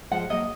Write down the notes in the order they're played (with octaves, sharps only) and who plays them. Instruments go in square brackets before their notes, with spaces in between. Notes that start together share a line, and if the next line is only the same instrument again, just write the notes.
[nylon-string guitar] F3 G#3 [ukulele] F#5
[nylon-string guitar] F#3 A#3 [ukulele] D#5